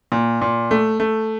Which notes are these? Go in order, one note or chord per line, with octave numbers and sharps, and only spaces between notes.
A#2
A#2
A3
A3